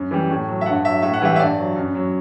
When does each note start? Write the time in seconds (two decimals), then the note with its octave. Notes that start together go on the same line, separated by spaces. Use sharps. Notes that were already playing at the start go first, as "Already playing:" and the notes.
Already playing: F#2
0.11 E3 G3
0.30 A2
0.47 F#3
0.61 E5
0.66 G2 F#5
0.84 F#3 E5
1.02 A2 E5
1.13 F#5
1.22 E3 G3 E5
1.36 E5
1.39 G2 D5
1.58 F#3
1.76 F#2
1.95 F#3